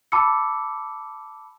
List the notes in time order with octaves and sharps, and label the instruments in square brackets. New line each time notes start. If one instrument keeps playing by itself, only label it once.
[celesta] A5 B5 D6 E6 C#7